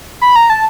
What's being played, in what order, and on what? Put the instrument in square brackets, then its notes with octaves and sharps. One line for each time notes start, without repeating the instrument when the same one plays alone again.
[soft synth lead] B5
A#5
A5